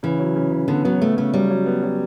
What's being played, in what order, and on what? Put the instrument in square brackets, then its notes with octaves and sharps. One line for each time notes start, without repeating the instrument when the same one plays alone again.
[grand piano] C#3 [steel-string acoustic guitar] E3
[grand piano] F#3
C#3
C#3
[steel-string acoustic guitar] D3 [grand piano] B3
[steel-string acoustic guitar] F#3 [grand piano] B3
[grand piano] C#3 [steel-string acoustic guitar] A3
[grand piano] C#3 [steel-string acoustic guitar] A3
[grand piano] F#3 [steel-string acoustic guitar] G3
[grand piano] F#3
B3
F#3